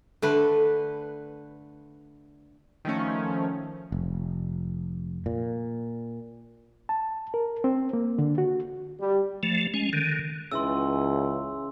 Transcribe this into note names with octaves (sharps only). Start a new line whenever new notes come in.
D3 A3 B4
D#3 F3 A3 C#4
F1
A#2
A5
A#4
C4
A#3
D3
F#4
G3
F3 A3
G#3 C#4
D3 D#3
C#2 C#3 E3 C6 E6